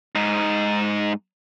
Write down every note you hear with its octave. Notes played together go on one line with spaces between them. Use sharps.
G#2 D#4